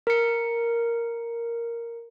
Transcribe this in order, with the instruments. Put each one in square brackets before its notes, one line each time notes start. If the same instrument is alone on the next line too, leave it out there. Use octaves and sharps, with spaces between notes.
[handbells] A#4 C#7